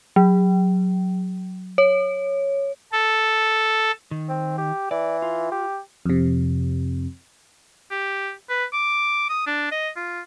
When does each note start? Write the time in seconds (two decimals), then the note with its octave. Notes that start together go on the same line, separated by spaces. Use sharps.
0.16 F#3
1.78 C#5
2.92 A4
4.11 D#3
4.29 C4
4.58 G4
4.91 E3 D5
5.22 F4
5.52 G4
6.06 F2 C3
7.91 G4
8.49 B4
8.73 D6
9.29 D#6
9.46 D4
9.72 D#5
9.96 F4